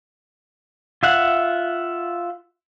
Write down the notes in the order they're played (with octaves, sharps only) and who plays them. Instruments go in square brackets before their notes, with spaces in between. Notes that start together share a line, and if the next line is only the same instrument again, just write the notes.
[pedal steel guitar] F4 E5 F#5